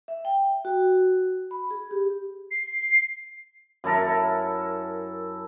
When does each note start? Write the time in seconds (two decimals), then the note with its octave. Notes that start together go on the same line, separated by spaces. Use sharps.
0.08 E5
0.25 G5
0.65 F#4
1.51 B5
1.71 G#4
1.91 G4
2.51 C7
3.84 F#2 E4 A4 A#4